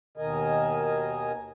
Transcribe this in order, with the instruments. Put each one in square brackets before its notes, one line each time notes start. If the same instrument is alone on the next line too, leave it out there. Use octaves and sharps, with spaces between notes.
[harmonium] D#2 B2 D#3 A#4 D#5 G#5